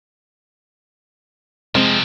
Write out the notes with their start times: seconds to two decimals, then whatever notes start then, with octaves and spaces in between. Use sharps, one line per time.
1.75 C3 F3 G#3 C4